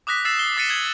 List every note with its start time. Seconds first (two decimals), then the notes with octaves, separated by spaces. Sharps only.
0.07 D6 D#6 F#6 A#6 B6
0.25 E6 A6 C7 E7
0.39 C7 G7
0.57 D6 A6 B6 C#7 D#7 E7
0.69 G#6 F#7